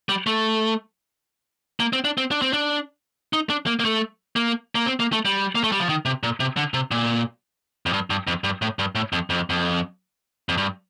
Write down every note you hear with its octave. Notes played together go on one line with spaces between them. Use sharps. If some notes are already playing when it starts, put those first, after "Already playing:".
G3
A3
A#3
C4
D4
C4
D4
C4
D4
D#4
D4
A#3
A#3
A3
A#3
A#3
C4
A#3
A3
G3
A#3
A3
G3
F3
D#3
C3
A#2
C3
D3
C3
A#2
F2
G2
G2
F2
G2
A2
G2
A2
F2
F2
F2
F2
G2